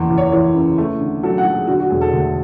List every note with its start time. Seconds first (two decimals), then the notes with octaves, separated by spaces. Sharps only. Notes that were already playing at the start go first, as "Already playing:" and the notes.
Already playing: F#1 E2
0.10 E2
0.18 C#5
0.32 E3 C#5
0.54 C#3
0.78 A3
1.01 D3
1.23 F#3 A4
1.38 F#5
1.45 F#3
1.53 G#4
1.67 D3 F#4
1.79 F#4
1.90 E1 G#4
2.01 A4
2.13 D2